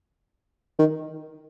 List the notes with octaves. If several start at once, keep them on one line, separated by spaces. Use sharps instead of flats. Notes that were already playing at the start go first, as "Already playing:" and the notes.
D#3